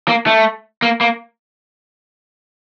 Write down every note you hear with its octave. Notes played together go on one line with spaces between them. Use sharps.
A#3
A3
A#3
A#3